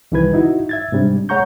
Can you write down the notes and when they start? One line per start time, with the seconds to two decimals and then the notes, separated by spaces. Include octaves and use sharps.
0.12 C2 D#3 E3 G3 B4 G#6
0.34 D#4 E4 F#4
0.69 E5 G#6 A6
0.92 G#2 C3 G3 D4
1.29 G#3 C#5 F#5 A#5 C#6 G6